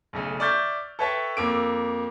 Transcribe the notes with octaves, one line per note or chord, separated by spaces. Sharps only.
B1 C#3 A3
D5 E5 C#6 F6 G6 A6
A4 B4 C#5 E5 G5 A5
F2 A#3 D6 E6 D7